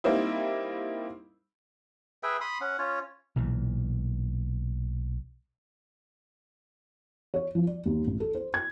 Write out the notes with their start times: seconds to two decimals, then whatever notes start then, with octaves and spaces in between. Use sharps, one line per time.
0.04 G3 A#3 C4 D#4 E4
2.23 G#4 B4 E5 G5
2.41 B5 C6 D#6
2.61 C#4 F#5
2.79 C#4 F4 C#5
3.36 B1 A#2 E3
7.34 C#5
7.55 F3
7.67 D5
7.85 D#2
8.07 A1
8.20 A4
8.35 C5
8.54 G#6